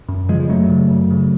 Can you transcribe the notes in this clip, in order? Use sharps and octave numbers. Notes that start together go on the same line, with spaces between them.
F#2
C#3 F3 G#3
G#3
F#2 F#3 A3
C#3
F#2
C#3